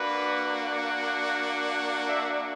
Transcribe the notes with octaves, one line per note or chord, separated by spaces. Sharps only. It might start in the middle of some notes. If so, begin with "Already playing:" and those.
Already playing: A#3 D4 F#4 B4
E5